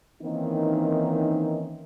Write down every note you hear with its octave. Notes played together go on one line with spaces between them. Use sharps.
D#3 E3 A#3 C4 C#4 D#4